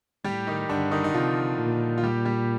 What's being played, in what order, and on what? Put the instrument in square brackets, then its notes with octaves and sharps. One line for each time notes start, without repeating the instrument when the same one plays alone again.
[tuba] A2 [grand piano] G3 G4
[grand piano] D#3 D#4
[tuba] G2 [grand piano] D3 D4
[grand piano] D#3 D#4
D#4
[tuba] C3 [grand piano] F3 F4
[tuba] A#2
[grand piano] F4
G3 G4
G3 G4